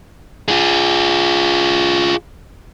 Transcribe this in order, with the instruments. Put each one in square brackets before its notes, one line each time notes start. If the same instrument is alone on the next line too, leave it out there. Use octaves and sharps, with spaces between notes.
[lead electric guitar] F4 G#4